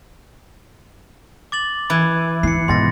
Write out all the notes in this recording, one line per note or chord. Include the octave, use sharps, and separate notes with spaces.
D6 A6 F#7
E3 B5 G#6
E4 C7 C#7
F1 G#2 B2 C6 A6 A#6